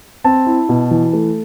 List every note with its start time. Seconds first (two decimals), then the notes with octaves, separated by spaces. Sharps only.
0.24 C4 A5
0.47 E4
0.69 B2
0.91 E3
1.13 A3